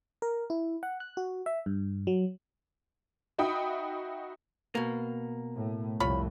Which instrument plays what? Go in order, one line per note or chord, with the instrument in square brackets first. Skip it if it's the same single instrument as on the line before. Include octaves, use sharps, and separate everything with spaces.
[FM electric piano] A#4
E4
F#5
F#6
F#4
E5
G2
F#3
[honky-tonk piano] D#4 F#4 E5 G5 B5 D#6
[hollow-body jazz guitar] B2 A#3
[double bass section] A2
[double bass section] C2 F2 A2 [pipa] F4 C#5 B5